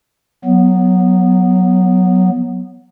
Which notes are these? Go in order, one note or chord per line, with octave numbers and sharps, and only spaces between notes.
F#3 B3